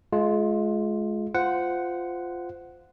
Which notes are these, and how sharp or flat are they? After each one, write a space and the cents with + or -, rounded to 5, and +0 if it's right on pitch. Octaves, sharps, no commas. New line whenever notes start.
G#3 +30 F4 +0
F4 +0 C5 -20 F#5 +0